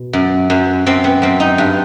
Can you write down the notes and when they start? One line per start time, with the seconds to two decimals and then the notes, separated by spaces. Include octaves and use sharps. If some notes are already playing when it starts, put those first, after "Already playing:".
Already playing: B2
0.13 F#2
0.50 F#2
0.86 F#2 C4
1.04 B3
1.22 F#2 C4
1.40 D#4
1.58 G2